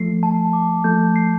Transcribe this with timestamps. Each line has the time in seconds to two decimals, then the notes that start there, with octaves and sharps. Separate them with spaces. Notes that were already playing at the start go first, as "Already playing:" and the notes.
Already playing: F3 A3 C7
0.23 A5
0.53 D6
0.84 F3 A3 G6
1.16 C7